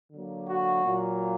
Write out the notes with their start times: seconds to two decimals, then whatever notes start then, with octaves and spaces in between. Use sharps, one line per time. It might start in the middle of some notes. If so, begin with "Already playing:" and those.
0.12 D3 F#3 A#3
0.47 F#4
0.83 A#2 F#3 A#3